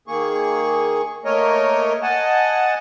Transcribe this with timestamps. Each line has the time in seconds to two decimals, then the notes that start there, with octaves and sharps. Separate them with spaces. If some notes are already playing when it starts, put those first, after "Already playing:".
0.08 D#3 A#3 G#4 C#6
1.25 A3 A#3 A#4 C#5 D#5
2.02 D#5 F#5 G#5 A5